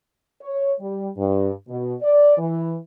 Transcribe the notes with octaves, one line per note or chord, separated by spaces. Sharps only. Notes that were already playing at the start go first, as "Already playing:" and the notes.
C#5
G3
G2
B2
D5
E3